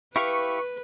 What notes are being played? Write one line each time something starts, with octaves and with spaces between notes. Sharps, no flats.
E4 G4 B4 F5 C#6